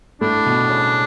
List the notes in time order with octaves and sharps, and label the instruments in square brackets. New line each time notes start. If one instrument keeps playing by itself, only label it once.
[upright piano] A2 A3 [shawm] D4
[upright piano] B2 B3
C#3 C#4